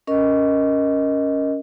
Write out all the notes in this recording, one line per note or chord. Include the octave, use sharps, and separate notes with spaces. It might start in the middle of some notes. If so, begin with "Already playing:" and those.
C#4 A#4 D#5